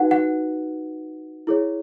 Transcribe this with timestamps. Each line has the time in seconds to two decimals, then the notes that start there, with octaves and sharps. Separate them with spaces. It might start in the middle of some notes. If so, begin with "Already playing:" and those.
Already playing: D#4 F#4 B4 F#5
0.11 F#5
1.47 E4 G#4 C#5